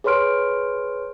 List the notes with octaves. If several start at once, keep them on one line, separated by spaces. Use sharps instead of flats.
G#4 B4 C#5 C6 F6 D7